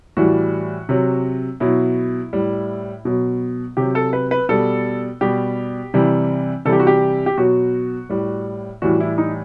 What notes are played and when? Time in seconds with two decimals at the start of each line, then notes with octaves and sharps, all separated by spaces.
0.17 A2 E3 G3 F#4
0.89 C3 F#3
1.60 B2 F#3 E4
2.33 A2 G3
3.05 B2 F#3
3.77 C3 F#3 G4
3.95 A4
4.13 B4
4.31 B4
4.49 B2 G3 A4
5.21 B2 G3 G4
5.94 C3 E3 G3
6.65 C3 E3 G3 A4
6.73 G4
6.80 F#4
6.87 G4
7.26 G4
7.38 B2 F#3 F#4
8.10 A2 G3
8.82 A2 E3 G3 F#4
9.00 E4
9.18 D#4